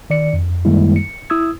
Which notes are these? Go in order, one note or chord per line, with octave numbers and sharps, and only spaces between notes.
D#3 D5 C#7
F2
F#2 D#3 G3 G#3 A#3 E4
C#7
E4 D#6 E6 G#6